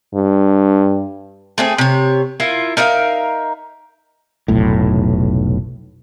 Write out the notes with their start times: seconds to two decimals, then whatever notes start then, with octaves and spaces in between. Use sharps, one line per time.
0.14 G2
1.58 A3 C4 G#4
1.78 C3 C#5
2.40 E4 F4 A#4
2.77 D#4 A#4 E5 F5
4.48 F1 B1 A2